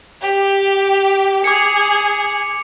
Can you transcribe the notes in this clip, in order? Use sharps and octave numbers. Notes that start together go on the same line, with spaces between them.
G4
G#4 D6 C#7